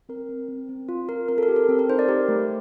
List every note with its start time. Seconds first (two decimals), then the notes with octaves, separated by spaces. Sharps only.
0.09 C4 A#4
0.29 C4
0.48 C4
0.69 C4
0.89 F4
1.09 F4 A#4
1.28 C4 A#4
1.38 A4
1.43 A#4
1.48 G4
1.56 A4
1.69 C4 A4
1.79 A#4
1.89 D#4 C5
1.99 D5
2.09 G4 A#4
2.29 A3